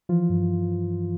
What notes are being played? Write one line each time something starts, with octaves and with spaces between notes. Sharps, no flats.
E3 F3 F4
G2